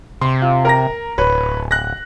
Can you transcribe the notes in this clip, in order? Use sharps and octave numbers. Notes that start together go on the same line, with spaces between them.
C3 C6
F4
A#4 A#5 A#6
D1 B4 C#5
F#6 A#6